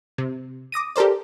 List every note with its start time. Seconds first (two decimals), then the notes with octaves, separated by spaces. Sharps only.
0.18 C3
0.72 D6 D#6 A#6 D#7
0.96 G4 A4 A#4 C5 D5